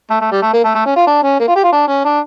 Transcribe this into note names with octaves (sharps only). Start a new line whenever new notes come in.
A3
A3
G3
A3
A#3
A3
A3
C#4
F4
D4
C#4
A#3
F4
G4
F4
D4
C#4
D4